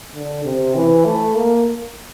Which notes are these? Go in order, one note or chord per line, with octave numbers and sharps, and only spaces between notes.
D3
C3
E3
A3
A#3